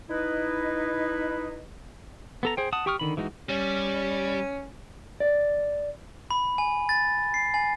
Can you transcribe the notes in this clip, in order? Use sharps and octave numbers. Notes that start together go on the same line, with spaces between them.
D#4 E4 B4 D#5
B3 A4 A#5
G#4 C5 G5
F#5 A5 D#6
G4 G5 C#6 D#6 F6
D3 D#3 B5
E3 G#3 D#4 F4 F#4
G3 C#4
D5
B5
G#5
A6
C7
G#5